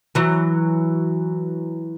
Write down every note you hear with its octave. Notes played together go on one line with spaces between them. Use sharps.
E3 F#3